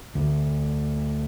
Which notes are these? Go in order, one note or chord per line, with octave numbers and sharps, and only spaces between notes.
D2